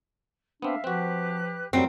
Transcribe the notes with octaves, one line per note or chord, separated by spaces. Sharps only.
B3 C4 D4 E5 F5
F3 C4 F#4 G4 B4 F#6
F#2 A2 F#3 G3 C4 A#4